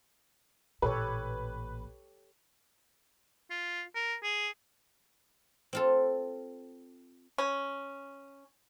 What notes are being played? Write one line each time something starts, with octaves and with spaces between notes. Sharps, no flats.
A1 A#2 G4 A4 B4 C#5
F4
A#4
G#4
C4 F4 A4
C#4